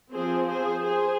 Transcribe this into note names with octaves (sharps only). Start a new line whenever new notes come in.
F3 C4 G#4 C5
G#4 C5
G#4 C5